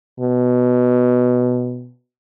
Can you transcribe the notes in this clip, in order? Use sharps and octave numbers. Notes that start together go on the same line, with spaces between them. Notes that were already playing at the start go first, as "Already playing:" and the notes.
B2